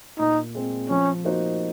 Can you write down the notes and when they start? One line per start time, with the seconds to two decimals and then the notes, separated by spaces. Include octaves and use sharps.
0.18 A#2 D#4
0.55 G#3 C4
0.89 F3 C#4
1.25 A#3 D#4 F#4 C5